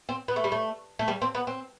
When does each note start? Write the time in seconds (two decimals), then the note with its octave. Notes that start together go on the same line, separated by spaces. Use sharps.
0.09 C4
0.28 B3
0.36 A3
0.44 G3
0.52 A3
0.99 A3
1.08 G3
1.22 C4
1.35 B3
1.47 C4